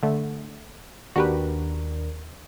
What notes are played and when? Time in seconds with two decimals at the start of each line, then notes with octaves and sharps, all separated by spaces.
0.03 D3 A3
1.16 D#2 D4 F#4 G4 A#4 B4